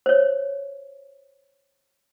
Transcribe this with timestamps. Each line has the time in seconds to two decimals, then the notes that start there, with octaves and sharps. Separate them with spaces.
0.06 C5 C#5